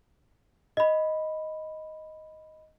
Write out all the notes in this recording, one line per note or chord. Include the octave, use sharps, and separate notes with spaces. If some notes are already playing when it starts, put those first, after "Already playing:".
D#5 B5